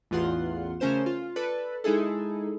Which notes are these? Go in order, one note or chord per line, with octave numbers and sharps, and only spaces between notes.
A1 E2 F4 F#5 C6
C#3 A3 C#4 A#4 C5 E7
F4
A4 B4 D5
G#3 D#4 E4 G#4 A4